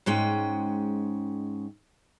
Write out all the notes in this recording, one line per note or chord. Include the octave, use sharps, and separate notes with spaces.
G#2 G#3 C#4 G5